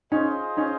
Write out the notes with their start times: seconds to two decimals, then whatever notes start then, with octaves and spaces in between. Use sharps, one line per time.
0.11 C#4 D#4 F4 G#4 C5 D#5
0.57 C#4 D#4